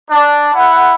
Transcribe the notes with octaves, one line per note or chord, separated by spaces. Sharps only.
D4
E4 F#5